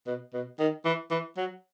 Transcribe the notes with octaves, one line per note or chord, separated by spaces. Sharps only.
B2
B2
D#3
E3
E3
F#3